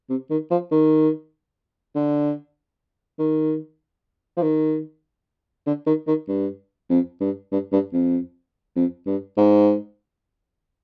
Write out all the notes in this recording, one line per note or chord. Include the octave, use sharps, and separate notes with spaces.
C3
D#3
F3
D#3
D3
D#3
F3
D#3
D3
D#3
D#3
G2
F2
G2
G2
G2
F2
F2
G2
G#2